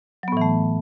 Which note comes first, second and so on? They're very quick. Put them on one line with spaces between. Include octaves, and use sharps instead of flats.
F#3 B3 A2 E3 A3